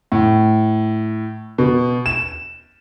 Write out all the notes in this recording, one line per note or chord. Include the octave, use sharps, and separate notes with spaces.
A2
B2
E7